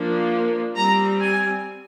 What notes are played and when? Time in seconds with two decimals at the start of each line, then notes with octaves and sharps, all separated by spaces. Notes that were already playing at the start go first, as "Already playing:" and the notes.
Already playing: F3 A#3 D4
0.76 G3 C4 A#5
1.22 G#5